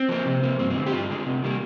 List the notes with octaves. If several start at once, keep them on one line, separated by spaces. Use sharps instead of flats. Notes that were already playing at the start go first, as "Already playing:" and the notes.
Already playing: C4
F3 A#3
C3
F3 A#3
G2 C4
C4
D3 G#3
G4
G2 F4
D3 G#3
C3
D#3 G3 A#3